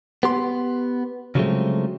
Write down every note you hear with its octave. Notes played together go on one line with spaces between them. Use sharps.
B3 G4 C6
C#3 F3 F#3 G#3 A3 C4